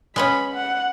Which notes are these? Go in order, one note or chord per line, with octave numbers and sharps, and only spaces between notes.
G#3 B3 C#4 B5
F#5